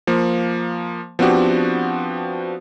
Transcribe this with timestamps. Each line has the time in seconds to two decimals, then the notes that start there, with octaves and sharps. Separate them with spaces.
0.07 F3 A#3
1.19 F3 B3 C4 D4 F#4 G4